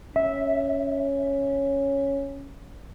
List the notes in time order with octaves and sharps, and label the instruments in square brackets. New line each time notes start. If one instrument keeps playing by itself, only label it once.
[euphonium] C#4 [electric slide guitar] E5